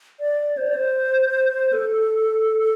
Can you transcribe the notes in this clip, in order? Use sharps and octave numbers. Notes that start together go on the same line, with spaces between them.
D5
C5
D5
C5
A4